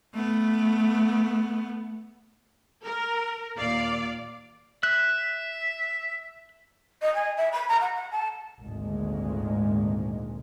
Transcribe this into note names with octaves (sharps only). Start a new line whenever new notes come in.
A3 B3
A#4
D#2 A#2 D5 F5
E5 F#6
D#5
G#5
E5
B5
A#5
F#5
F#5
A5
G#1 D2 A#2 G#3